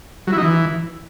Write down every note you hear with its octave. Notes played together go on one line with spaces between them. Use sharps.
F#3
E4
D#4
E3